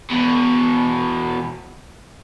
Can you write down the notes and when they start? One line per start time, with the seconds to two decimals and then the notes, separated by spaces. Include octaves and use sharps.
0.11 E2 B2